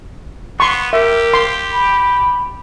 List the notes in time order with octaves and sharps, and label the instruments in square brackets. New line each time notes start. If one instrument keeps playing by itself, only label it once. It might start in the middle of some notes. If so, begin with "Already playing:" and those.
[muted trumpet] B3 [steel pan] C6 C#6
[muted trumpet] G4 [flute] A#4 [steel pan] E5
[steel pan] C6
[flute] B5